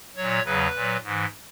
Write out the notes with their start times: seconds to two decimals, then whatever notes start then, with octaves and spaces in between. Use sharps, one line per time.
0.16 A#2 F#3 C#5
0.45 E2 C#3 F#3 B4
0.74 A#2 F#3
1.03 G#2 E3